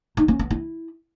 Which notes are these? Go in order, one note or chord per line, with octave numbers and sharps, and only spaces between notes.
D#4
C#4
B3
E4